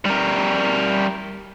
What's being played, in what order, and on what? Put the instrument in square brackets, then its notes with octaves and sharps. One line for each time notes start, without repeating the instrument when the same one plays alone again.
[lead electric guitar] G3 A#4